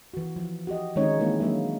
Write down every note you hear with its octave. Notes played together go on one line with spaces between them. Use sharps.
E3 F#4
F3
F#4 G4 D#5
D#3 G#3 C4 C#4 D#4 C#5
E3 G#3 A#3 C4 E4
F#3 G#3 A#3 D4 A#4 E5